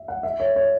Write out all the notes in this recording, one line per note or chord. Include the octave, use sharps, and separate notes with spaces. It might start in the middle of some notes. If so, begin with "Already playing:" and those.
Already playing: E5
F#5
E5
C#5
C#5